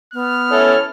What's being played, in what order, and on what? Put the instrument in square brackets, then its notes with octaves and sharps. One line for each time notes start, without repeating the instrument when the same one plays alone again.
[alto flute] B3 [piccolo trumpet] F6
[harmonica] C#4 E4 A4 [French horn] C#5